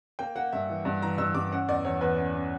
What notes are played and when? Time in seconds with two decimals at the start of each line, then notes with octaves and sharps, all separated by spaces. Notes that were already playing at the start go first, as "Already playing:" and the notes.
0.19 A#3 G5
0.36 A#3 F#5
0.52 G2 E5
0.70 E3
0.85 G2
1.02 E3 A#5
1.18 G2 E6
1.35 G2 D6
1.51 C#4 F#5
1.68 E2 D5
1.85 E2 C#5
2.01 E2 B4
2.17 C#4
2.34 C#4